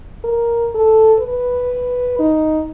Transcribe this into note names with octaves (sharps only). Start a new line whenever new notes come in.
A#4
A4
B4
D#4